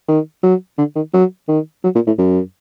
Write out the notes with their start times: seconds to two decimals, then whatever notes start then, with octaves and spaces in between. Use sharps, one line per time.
0.09 D#3
0.43 F#3
0.78 D3
0.96 D#3
1.14 F#3
1.48 D#3
1.84 F#3
1.95 A#2
2.07 A2
2.18 F#2